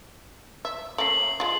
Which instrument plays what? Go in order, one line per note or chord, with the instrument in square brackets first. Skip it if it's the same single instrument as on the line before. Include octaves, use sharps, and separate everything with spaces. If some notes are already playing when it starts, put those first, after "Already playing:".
[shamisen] E5
[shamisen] A3 A#3 C#4 [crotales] C7 F#7
[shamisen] G#3 F4